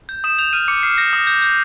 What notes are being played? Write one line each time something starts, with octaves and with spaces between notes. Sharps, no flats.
G6
D#6 E7
G6 F7
F6 D#7
D6 C#7
F6 C7
G6 A#6
D#6
G6
G6